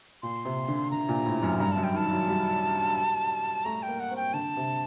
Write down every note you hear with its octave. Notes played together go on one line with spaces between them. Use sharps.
A#2 C6
C3
D3
D3 A#5
A#2
A2
F#2
G2 A#5
F#2 A5
G5
D#3 A5
F#3
G3
A3 A#5
G5
A#3
F#5
C4
G5
D3 A5
C3